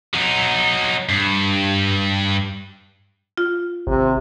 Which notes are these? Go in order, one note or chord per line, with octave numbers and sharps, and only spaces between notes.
F#3 D#4
G2
F4
G#1 C3